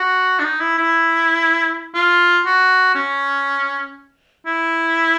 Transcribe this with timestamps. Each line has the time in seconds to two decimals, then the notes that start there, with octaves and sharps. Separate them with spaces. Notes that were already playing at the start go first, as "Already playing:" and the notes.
Already playing: F#4
0.39 D4
0.44 D#4
0.60 E4
0.78 E4
1.94 F4
2.45 F#4
2.95 C#4
4.46 E4